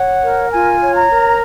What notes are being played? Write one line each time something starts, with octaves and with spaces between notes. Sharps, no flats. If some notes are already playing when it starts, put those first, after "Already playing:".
Already playing: C#5 F#5
A#4
F4 G#5
C#5
A#5
A#4